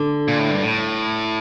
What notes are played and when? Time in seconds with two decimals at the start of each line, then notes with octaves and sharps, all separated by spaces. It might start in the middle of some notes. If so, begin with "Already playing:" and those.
Already playing: D3
0.28 A#2
0.39 A2
0.51 G2
0.63 A2